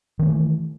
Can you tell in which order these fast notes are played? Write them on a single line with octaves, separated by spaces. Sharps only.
D#3 C4 A3 E3